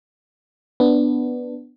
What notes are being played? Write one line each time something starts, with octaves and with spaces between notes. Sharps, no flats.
B3 D4